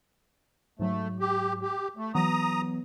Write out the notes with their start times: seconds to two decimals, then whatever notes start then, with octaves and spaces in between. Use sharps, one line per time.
0.79 G#2 F#3 A3
1.20 G4
1.61 G4
1.97 A3
2.15 E3 F#3 B3 A#5 D#6